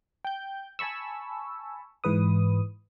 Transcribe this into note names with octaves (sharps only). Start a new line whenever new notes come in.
G5 G6
G#5 A5 B5 C#6 E6
G#2 E3 B4 D#6